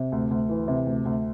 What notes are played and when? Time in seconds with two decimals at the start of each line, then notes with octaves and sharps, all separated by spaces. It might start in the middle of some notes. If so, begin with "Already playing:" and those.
Already playing: C3
0.12 D2
0.31 D2
0.49 E3
0.68 C3
0.87 D2
1.05 D2